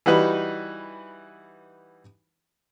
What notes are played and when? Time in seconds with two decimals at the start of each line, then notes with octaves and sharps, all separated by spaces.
0.06 E3 G3 D#4 F#4 B4